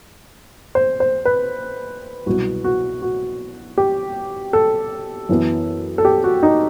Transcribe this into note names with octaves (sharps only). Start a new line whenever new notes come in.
C5
C5
B4
C2 B2 F#3 B3 F#4
F#4
F#4
G4
A4
F#2 E3 B3
A4
G4
F#4
D#4